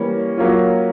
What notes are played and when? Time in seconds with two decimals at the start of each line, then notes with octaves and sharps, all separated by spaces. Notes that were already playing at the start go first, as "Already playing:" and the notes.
Already playing: E3 G3 A#3 C#4
0.38 F#3 A#3 C#4 F4